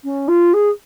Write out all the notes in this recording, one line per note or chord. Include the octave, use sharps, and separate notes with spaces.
C#4
F4
G#4